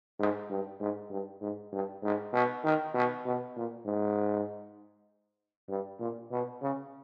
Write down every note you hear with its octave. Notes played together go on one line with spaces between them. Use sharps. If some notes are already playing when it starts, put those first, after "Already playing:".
G#2
G2
G#2
G2
G#2
G2
G#2
B2
D#3
B2
B2
A#2
G#2
G2
A#2
B2
C#3